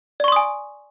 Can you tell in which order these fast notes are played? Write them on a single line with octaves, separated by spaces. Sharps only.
D5 C#6 C6 D#6 G#5